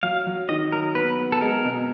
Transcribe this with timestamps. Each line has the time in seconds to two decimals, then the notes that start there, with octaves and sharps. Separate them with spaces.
0.03 F#3 F5
0.27 F#3
0.49 D#3 D#5
0.72 F#3 A#4
0.95 B3 B4
1.18 B3
1.32 A4
1.41 G#3 A#4
1.65 B2